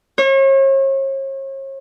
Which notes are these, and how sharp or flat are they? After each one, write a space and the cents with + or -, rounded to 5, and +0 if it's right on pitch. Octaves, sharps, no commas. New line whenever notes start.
C#5 -40